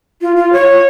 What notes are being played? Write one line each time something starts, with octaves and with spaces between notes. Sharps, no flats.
F4
F4
C#5